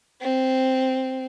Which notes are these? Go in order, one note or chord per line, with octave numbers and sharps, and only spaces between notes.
C4